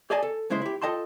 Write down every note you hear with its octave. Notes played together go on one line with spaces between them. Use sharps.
G4 G#4 D5 D#5 G#5 A5
A4
B1 C#3 G#3 E4 C5
E4 G4
F4 A4 D#5 G5 A5 C6